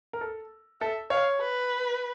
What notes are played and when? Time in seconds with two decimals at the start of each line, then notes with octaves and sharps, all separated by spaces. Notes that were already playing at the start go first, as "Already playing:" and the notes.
0.13 A#4
0.21 A4
0.81 A4 E5
1.10 C#5 F5
1.41 B4